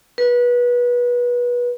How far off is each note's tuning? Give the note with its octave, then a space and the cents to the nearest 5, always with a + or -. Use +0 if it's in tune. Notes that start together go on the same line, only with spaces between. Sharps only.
B4 -25